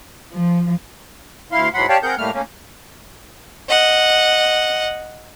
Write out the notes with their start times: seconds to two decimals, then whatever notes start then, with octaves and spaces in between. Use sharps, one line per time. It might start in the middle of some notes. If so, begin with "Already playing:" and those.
0.32 F3
1.52 D2 E4 F5 C6
1.74 G#2 E3 F#3 F#5 B5 C6
1.89 G4 C#5 D5 F5 G5 A5
2.03 C4 G#4 A#4 F#5 G6
2.18 A2 G3 A3 A#3 F6
2.33 A3 A#3 C#4
3.69 D#5 F#5